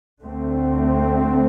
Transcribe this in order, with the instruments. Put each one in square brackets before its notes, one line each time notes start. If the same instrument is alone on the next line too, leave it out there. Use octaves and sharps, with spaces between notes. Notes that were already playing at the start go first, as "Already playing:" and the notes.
[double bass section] D2 D3 A3 C4